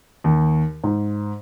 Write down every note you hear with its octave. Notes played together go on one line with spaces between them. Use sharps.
D#2
G#2